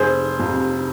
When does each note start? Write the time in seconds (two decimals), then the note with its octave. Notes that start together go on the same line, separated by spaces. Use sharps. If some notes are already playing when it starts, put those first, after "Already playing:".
Already playing: F1 G#4 C5
0.40 F2 C3